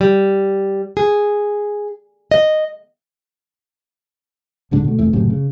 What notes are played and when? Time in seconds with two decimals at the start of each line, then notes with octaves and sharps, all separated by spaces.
0.01 G3
0.97 G#4
2.31 D#5
4.71 D1 G#2 D3 D4
4.84 B2 A3
4.99 F1 F2 E3 A3
5.13 F#1 F#2 A2 C3
5.30 C#3